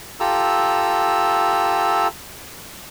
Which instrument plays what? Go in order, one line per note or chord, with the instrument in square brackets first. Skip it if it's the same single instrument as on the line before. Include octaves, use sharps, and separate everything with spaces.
[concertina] F4 G4 A4 A#5 E6